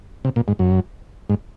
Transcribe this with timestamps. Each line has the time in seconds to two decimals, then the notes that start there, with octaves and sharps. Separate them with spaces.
0.25 C3
0.36 A#2
0.48 G#2
0.59 F#2
1.30 G#2